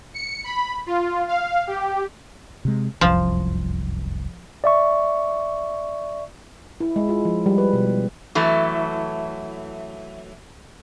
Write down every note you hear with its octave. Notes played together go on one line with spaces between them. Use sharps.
C#7
B5
F4
F5
G4
C3 G#3
F1 C2 F#2 F3
D5 E5 C#6
E4
G#3
F4
F3
G3
B4
B2
G#3
E3 F#3 A3